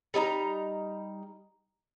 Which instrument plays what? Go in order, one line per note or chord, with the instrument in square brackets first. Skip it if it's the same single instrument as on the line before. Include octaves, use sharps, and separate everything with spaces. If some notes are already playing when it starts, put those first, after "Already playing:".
[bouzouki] G3 D#4 G#5 A#5